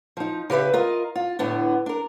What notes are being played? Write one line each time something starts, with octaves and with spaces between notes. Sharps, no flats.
F3 D#4
C#3 G4 B4 E5
F4 A#4 D#5
F4
A2 D3 B3 D4
D4 A#4